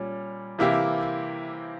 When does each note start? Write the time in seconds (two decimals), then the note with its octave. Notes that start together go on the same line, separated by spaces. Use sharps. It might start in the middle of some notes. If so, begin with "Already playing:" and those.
Already playing: A#2 G3 C#4
0.59 C3 E3 A#3 E4 G4